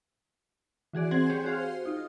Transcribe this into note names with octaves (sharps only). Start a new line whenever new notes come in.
E3 F#4 G#4 D5
C4 G#4 C5 F#5 G#5
G4 C5 C#5
F#4 G#4 C5 F5
D#4 F4